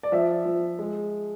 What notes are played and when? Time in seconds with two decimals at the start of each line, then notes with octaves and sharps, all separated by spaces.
0.03 D5
0.12 F3 E5
0.45 F3
0.79 G#3